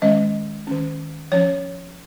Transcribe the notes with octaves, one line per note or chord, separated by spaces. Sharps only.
D#3 G#3 C#4 D#5
D#3 C#4
F3 C#4 C#5